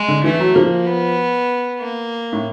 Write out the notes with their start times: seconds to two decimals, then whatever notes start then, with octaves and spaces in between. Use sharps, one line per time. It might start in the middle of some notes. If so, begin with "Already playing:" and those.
Already playing: G#3
0.08 D3
0.24 E3 A3
0.40 F#3
0.55 F3 A#3
0.86 B3
1.79 A#3
2.33 A2